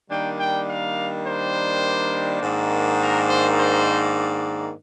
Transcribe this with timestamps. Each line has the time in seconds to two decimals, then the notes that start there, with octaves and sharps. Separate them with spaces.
0.11 D#3 G3 A#3 D4 G5
0.39 G5
0.68 F5
1.26 C5
2.42 G#2 D#3 A#3 D4
3.00 A#4
3.29 C5
3.58 C5